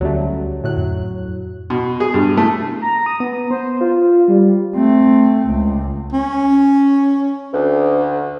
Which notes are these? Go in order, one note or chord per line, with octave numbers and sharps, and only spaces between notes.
D2 F#3 G3 A3 C#4
A2 F#3 F#6
F2
B2
G#4
G2
A3
A#5
D#6
B3
C5
F4
G3
A3 C4
C#2
C#4
D2